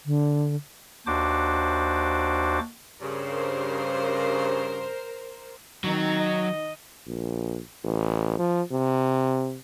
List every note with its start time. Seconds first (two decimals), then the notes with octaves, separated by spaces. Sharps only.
0.06 D3
1.07 D#2 D4 F#4 C5 D6
3.01 G2 C#3 A#4 C5
5.84 D#3 F#3 C4 D#4
6.20 D#5
7.07 A#1
7.84 A1
8.38 F3
8.72 C3